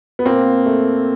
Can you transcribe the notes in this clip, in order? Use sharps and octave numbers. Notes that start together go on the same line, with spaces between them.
B3
A#2 A#3 C4
A3